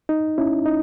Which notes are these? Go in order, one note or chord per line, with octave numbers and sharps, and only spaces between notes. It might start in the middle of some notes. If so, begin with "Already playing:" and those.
D#4
C#4 E4
D#4